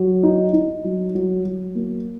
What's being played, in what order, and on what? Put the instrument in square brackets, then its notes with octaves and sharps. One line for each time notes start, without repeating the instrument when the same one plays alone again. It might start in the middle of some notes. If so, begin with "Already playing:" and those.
Already playing: [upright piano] F#3
D#4
D#4
F#3
F#3
F#3
A#3